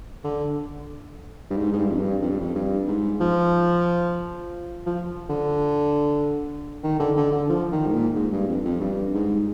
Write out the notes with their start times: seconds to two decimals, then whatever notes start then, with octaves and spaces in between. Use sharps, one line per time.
0.24 D3
1.50 G2
1.57 G#2
1.73 G#2
1.78 G2
1.90 F2
2.00 G2
2.22 F2
2.30 G2
2.39 F2
2.55 G2
2.87 G#2
3.20 F3
4.86 F3
5.29 D3
6.83 D#3
6.99 D3
7.16 D3
7.32 D3
7.49 F3
7.72 D#3
7.86 G#2
7.93 A#2
8.15 G#2
8.32 G2
8.48 F2
8.65 F2
8.80 G2
9.14 G#2